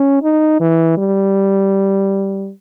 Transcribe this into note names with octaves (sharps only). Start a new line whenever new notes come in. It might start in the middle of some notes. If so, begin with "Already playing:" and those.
Already playing: C#4
D#4
E3
G3